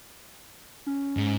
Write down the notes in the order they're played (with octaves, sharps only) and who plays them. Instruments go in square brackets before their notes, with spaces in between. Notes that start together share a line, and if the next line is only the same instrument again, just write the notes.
[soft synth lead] C#4
[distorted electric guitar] G#2